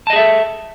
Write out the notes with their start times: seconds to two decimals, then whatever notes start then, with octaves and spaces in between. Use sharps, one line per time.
0.07 A5
0.10 D#5
0.13 G#4
0.16 E5
0.19 A4